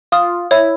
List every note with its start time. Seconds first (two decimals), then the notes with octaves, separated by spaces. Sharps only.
0.12 F4 D#6
0.51 E4 C#5